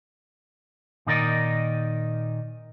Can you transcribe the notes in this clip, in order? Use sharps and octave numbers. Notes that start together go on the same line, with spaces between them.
A#2 D#3 D#4 A#4 D5 D#5